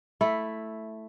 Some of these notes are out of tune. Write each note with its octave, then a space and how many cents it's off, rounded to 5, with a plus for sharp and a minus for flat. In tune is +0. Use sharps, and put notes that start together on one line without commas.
A3 +0 E4 +0